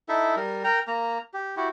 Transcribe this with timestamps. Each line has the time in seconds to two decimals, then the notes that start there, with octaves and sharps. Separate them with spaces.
0.09 D#4 E4 A4 E5
0.36 G3 A#4
0.64 A#4 G5 A#5
0.88 A#3 A#5
1.34 G4
1.57 E4 F#4 G4